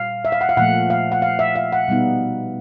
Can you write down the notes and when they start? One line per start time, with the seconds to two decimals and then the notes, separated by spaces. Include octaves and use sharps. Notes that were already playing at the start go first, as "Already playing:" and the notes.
Already playing: A#2 G3 F5
0.25 E5
0.32 F5
0.41 F#5
0.49 F5
0.57 A#2 F3 A3 F#5
0.90 F5
1.12 F#5
1.22 F5
1.39 E5
1.56 F5
1.72 F#5
1.88 B2 G3 B3 D#4